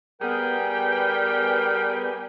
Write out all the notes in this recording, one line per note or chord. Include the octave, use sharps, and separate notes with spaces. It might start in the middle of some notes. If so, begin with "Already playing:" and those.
G3 B3 G#4 A#4 G5